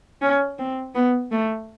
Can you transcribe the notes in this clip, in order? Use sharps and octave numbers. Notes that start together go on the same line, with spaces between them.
C#4
C4
B3
A3